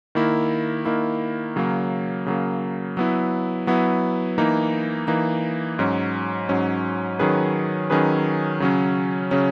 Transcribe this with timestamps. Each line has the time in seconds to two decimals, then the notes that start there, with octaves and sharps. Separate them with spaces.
0.15 D#3 A#3 E4
0.85 D#3 A#3 E4
1.56 C#3 F#3 A#3
2.26 C#3 F#3 A#3
2.97 F#3 B3 E4
3.67 F#3 B3 E4
4.38 E3 A#3 D#4
5.08 E3 A#3 D#4
5.79 G#2 F#3 C#4
6.49 G#2 F#3 C#4
7.19 D#3 F#3 C#4 G#4 B4
7.90 D#3 F#3 C#4 G#4 B4
8.60 C#3 F#3 C#4
9.31 C#3 F#3 C#4